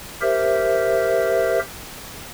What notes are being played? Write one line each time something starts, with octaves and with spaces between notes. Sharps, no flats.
G4 A#4 C5 E5